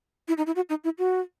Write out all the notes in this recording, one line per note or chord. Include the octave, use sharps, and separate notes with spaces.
E4
D#4
E4
F#4
D#4
E4
F#4